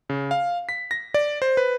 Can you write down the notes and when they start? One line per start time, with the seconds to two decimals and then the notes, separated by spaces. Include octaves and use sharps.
0.10 C#3
0.31 F5
0.69 B6
0.91 A#6
1.14 D5
1.42 C5
1.57 B4